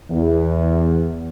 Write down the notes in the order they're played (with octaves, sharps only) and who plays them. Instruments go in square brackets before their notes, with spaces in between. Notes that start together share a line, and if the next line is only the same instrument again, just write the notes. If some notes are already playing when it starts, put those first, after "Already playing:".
[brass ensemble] E2